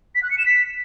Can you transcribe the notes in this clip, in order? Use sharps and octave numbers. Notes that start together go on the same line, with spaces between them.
B6
F#6
C#7
E7
B6